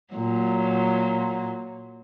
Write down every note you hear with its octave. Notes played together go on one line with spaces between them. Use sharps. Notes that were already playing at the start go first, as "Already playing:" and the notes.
A#2 F#3